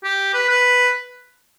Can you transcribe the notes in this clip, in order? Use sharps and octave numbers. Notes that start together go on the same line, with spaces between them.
G4
B4
B4